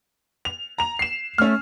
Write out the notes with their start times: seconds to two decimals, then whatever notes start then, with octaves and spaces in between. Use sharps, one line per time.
0.45 F7
0.78 A#5 F7
0.99 C7 E7
1.38 A3 C#4 F6